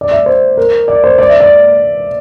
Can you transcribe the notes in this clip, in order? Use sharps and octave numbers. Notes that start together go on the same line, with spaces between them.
D5
E5
C5
A#4
D5
C5
D5
E5
D5